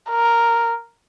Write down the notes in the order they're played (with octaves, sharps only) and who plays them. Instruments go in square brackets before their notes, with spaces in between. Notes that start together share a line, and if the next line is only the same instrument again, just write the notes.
[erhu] A#4